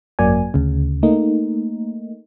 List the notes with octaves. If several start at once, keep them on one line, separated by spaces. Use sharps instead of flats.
G#1 F#2 F#3 A#3 D5 G#5
D2 C#3
A3 A#3 D#4